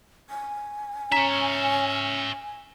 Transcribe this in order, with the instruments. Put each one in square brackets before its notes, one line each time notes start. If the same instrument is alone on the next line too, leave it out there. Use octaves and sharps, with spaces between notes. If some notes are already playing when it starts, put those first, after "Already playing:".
[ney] G#5
[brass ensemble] C#4 [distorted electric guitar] C#5 E5 [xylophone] A#5 B6 E7